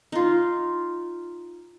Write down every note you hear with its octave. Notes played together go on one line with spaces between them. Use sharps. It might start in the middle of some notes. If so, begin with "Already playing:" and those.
D#4 F4